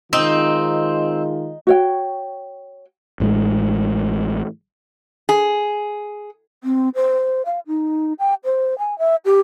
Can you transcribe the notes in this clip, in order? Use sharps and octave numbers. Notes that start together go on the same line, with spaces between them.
D#3 G#3 C4 D#4 F4
F#4 C#5 G5
A1 A2 C#3 G#3
G#4
C4
C5
F5
D#4
G5
C5
G#5
E5
G4